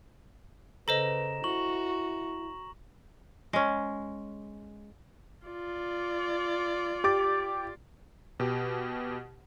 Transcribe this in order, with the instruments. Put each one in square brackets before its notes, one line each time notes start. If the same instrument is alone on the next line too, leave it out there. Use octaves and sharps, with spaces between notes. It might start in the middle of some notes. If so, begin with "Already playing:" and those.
[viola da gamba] C#3 [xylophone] A4 C5 D#5 [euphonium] B4 [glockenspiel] A#5 A#6 E7
[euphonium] E4 [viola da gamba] F#4 [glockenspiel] C#6 F#7
[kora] G#3 C#4
[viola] F4 D5
[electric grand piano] G4 D6 A6
B2 G4